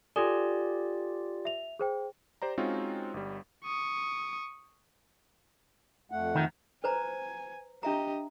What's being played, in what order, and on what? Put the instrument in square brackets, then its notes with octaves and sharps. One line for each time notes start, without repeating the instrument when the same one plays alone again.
[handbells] F4 G4 D5 [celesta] A4 G#5 D#6
[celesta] E5 F7
G#4 C5 G5
[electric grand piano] G4 C5 D5 A#5
G#3 C4 C#4 D#4 F4 F#4
G1 G3
[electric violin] C#6 D#6
[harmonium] F2 A3 F#5
[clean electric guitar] D#3
[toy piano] B4 C5 A#5 [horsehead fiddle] G#5
[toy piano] D4 E5 A#5 [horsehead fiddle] G4 D#5